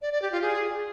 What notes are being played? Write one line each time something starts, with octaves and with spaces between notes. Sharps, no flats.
D5
D5
G4
F4
G#4